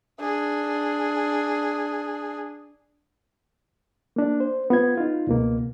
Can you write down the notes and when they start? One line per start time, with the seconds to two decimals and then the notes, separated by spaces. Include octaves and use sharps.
0.20 D4 G#4
4.16 A#3 D4
4.40 C5
4.70 B3 F4 G#6
4.98 D#4 F4
5.27 C#2 B2 A#3